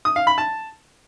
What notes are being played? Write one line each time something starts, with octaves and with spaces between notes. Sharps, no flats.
D#6
F5
B5
A5